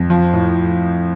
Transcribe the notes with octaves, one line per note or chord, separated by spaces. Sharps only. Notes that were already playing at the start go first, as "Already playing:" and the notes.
Already playing: F2
F3
A2